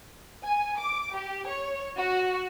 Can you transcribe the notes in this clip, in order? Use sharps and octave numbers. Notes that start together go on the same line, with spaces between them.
G#5
D6
G4
C#5
F#4